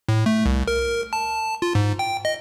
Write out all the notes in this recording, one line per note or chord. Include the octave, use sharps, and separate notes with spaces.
A2
A3
C2
A#4
A5
F4
G#2
G5
D#5